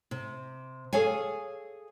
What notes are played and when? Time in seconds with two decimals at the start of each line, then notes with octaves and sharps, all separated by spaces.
0.11 C3
0.93 G#4 A4 C#5 F5 G#5